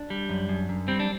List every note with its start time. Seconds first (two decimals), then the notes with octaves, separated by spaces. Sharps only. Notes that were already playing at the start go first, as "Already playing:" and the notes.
Already playing: D4
0.10 G3
0.29 F#2
0.49 F#2
0.69 F#2
0.88 G3 C4
1.00 D4